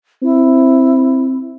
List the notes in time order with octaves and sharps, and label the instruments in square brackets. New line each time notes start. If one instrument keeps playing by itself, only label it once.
[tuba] C4 [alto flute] E4